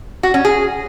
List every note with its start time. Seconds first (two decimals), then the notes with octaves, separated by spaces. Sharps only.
0.23 F#4
0.34 C#4
0.45 G#4